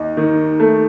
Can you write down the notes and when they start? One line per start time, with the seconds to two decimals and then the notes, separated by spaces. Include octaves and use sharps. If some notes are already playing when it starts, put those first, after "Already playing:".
Already playing: D#2 D#4
0.17 D#3
0.60 A3